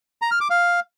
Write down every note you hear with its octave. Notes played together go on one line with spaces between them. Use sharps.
A#5
F6
D6
F5